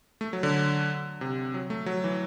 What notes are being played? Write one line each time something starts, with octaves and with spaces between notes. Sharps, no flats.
A3
F#3
D3
C3
F#3
A3
F#3
E3